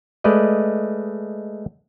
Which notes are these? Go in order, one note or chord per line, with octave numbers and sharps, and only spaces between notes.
G#3 A3 B4 D5 D#5